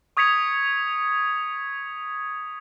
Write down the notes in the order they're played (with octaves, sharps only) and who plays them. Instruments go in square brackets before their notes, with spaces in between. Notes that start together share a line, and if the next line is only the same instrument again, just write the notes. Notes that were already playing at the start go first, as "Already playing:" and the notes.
[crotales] C#6 D#6 G#6 B6 C#7 F7